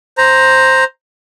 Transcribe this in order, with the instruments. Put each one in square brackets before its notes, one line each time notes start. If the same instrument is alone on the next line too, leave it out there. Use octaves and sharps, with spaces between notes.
[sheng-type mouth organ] C5 A#5